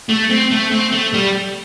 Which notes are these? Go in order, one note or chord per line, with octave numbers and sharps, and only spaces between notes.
A3
C4
A3
C4
A3
G3